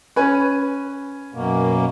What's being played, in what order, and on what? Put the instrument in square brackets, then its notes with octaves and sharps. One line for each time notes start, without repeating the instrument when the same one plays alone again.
[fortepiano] C#4 B4 G#5
[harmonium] F#2 B2 A#3